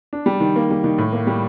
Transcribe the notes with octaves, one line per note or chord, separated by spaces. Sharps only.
D4
G3
D#3
A#3
G3
D#3
A2
A#3
G3